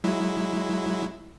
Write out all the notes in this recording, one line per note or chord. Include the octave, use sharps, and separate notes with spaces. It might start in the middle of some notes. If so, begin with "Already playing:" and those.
F#3 G#3 E4